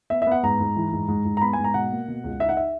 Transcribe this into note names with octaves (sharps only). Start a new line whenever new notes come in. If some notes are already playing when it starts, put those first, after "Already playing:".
B3 E5
B3 E5
F#5
G#2 A#5
G#2
E3
G#2
G#2
G#2
A#5
B3 B5
G#5
G#2
A#5
B2 F#5
A#3
B2
C#2
D#4 E5
F#5
E5